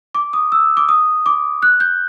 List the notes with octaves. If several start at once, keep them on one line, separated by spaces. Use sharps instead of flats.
D6
D#6
E6
D6
D#6
D6
F#6
G6